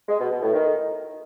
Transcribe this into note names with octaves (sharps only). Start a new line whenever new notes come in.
G#3
B2
B2
A2
D#3